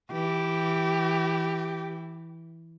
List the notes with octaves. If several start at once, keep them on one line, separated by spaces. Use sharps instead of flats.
E3 G4